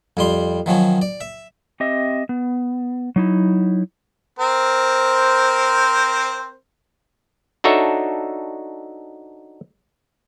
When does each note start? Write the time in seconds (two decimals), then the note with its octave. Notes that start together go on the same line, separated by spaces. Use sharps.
0.17 F2 G3 C6
0.66 D#3 F3 F#3 C#4
1.02 D5
1.21 E5
1.80 C4 G4 D#5 E5
2.29 B3
3.16 F#3 D#4 E4
4.39 C4 A#4 C5
7.64 D4 D#4 F#4 A4 C#5 E5